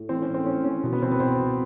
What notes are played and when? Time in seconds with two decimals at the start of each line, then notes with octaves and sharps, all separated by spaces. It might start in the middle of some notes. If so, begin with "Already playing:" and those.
Already playing: A2
0.09 E3 C4
0.22 C#4
0.28 A2
0.34 C4
0.46 A2 C#4
0.65 E3 C#4
0.83 B2
0.93 B3
1.02 B2 C4
1.12 B3
1.20 B2 C4
1.39 B2